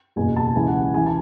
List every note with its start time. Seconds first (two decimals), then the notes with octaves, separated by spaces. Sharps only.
0.16 F#1 E2 B2 G#5
0.36 A5
0.55 C#2 C#3 E3 G#5
0.68 F#5
0.81 F#5
0.94 C#2 C#3 E3 G#5
1.06 A5